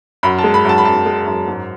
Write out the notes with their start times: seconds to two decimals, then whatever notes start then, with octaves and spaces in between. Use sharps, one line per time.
0.23 F#2 B5
0.38 A5
0.44 G#3
0.54 B5
0.65 F#2 A5
0.78 B5
0.85 F#2 A5
1.06 G#3
1.26 F#2
1.47 G#2